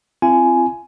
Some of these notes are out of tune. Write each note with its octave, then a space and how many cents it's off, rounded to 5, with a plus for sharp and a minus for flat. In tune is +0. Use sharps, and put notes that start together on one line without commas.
C4 +0 F4 -40 G#5 +10